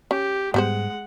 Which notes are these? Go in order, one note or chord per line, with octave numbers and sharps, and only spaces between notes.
C#4 G4
G#2 G3 G#3 B3 G4 C5 F#5